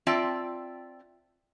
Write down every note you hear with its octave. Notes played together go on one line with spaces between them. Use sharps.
C4 F4 D5 E5 G5 A5